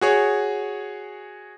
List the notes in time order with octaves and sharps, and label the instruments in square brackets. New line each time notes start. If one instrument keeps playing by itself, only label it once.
[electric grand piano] F#4 G#4 C#5